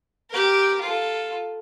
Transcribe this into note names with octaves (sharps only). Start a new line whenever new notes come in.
G4 A#4
F4 A4